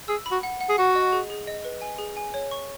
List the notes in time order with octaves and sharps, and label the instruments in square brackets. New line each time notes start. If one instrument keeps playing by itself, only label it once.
[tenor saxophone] G#4 [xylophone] E6
[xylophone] B5
[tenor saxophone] F#4
[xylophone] F#5
F#5
[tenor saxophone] G#4
[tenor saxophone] F#4 [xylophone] F#5
[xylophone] D#5
G#4
G#4
D#5
B4
G#5
G#4
G#5
C#5
C#6